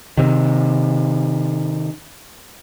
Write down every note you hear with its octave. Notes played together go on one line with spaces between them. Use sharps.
C3 D#3